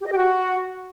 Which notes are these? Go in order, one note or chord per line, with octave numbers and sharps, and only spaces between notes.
G4
D#5
G4
F#4